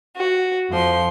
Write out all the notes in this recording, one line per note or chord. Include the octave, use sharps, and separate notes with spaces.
F#4
F2 F3 C6